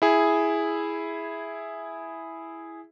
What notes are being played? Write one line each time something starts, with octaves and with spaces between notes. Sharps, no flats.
E4 G#4